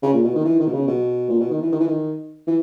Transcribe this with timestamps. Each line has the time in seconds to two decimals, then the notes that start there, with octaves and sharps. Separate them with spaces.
0.02 C#3
0.13 A#2
0.24 B2
0.35 D#3
0.45 E3
0.59 D#3
0.66 B2
0.73 C#3
0.87 B2
1.29 A#2
1.40 B2
1.51 D#3
1.62 E3
1.72 D#3
1.79 E3
1.87 D#3
2.47 E3